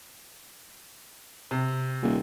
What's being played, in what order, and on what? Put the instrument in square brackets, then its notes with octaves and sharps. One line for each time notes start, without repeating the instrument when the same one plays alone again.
[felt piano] C3
[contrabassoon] D#1